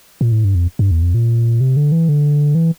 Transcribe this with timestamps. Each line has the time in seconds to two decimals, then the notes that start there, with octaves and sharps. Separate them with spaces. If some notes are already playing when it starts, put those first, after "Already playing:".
0.21 A#2
0.32 A2
0.45 G2
0.55 F2
0.79 G2
0.91 E2
1.02 F2
1.14 A#2
1.61 C3
1.77 D3
1.92 E3
2.09 D3
2.55 E3